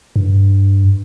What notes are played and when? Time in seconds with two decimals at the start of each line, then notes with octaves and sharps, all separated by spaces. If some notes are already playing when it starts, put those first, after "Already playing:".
0.16 G2